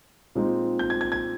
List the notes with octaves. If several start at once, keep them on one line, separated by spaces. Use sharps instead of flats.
A#2 G#3 C4 D#4
G6
G#6
G#6
G#6